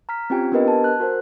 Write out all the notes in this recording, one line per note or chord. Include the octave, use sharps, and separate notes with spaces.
A#5 F6 B6
C4 C#4 F4 G4 G5 G#5
B3 D4 G4 A#4 B4 D#5
G#5 A5
F#6
F#4 A#4 C5